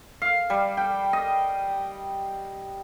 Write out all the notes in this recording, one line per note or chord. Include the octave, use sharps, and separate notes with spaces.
F5
G3
G5
D#5